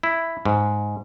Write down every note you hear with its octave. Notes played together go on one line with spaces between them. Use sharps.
E4
G#2